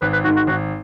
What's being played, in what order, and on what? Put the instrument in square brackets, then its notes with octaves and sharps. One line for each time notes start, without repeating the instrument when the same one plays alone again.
[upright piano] G#1 [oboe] B4
[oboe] B4
[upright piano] G#2 D#3 [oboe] F#4
[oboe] F#4
[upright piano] G#1 [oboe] F#4